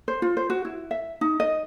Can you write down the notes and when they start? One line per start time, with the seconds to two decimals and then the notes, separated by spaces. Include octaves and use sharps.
0.08 C5
0.22 F4
0.37 C5
0.50 F#4
0.65 E4
0.91 E5
1.21 D#4
1.40 D#5